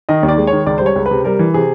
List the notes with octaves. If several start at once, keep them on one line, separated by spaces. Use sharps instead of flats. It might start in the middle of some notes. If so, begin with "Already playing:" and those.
D#3 D#5
D#2
D5
G#3
C#5
D#3
C#2 D5
C5
G3
C#5
C#2
B4
C3
G3 A#4
E3
C3 G#4